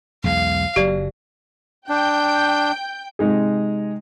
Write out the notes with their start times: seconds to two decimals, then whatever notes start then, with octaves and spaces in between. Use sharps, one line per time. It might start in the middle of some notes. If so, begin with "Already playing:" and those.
0.24 B1 E2 G#3 F5
0.76 F#1 F#3 G4 D5
1.89 D4 G5 G6
3.19 C3 G#3 D#4 G#4